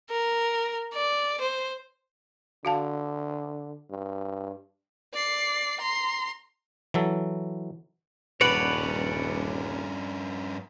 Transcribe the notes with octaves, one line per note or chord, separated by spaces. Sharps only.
A#4
D5
C5
D3 F#4 F5 A5
G2
D5 C7
A#5 C6
E3 F#3 A4
D#1 G2 C#4 B4 C#5 D5 F#5